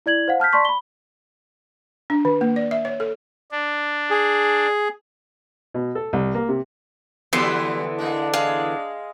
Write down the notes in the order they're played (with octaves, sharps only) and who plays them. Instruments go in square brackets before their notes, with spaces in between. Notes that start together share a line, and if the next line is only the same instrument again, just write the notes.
[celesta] E4 D5 G#6 F#7
C5 F5 F#5
A5 F6 G6 B6
D5 A5 C6 C#6 B6
B5 G7
[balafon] D4
D#3
A#3
D5
E5
C#5
A4
[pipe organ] D4
[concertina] G#4
[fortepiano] B2
A4
C2
A#3
C3
[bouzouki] D3 E3 B3 [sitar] F3 G3 B4 [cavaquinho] C6
[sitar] G#3 A#3 [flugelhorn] D4
[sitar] G#3 G#4 [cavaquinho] F5